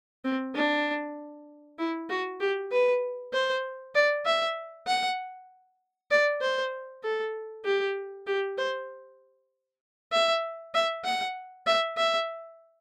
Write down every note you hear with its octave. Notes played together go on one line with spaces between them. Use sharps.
C4
D4
E4
F#4
G4
B4
C5
D5
E5
F#5
D5
C5
A4
G4
G4
C5
E5
E5
F#5
E5
E5